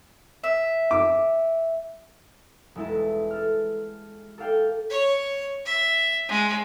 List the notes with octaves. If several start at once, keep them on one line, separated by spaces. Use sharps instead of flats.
E5
D6
E1 G#3 E4 A4 A5
A4 F6
A4 D5 F5 G5
C#5
E5
G#3